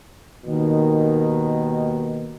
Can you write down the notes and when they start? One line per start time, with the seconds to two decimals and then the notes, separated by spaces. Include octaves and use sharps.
0.46 D#2 B2 D#3